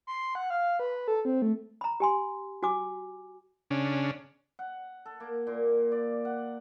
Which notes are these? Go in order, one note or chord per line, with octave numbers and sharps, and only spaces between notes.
C6
F#5
F5
B4
A4
C4
A3
A#5 B5
G4 G#5 C6
F#4 G#5 D6
C#3 C#4 D4
F#5
A4
A#3
A#2
D5
F#5